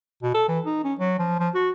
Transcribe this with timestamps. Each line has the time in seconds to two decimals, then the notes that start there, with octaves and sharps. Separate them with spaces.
0.22 B2
0.34 A4
0.48 E3
0.65 D#4
0.84 C#4
0.99 F#3
1.19 F3
1.39 F3
1.55 F#4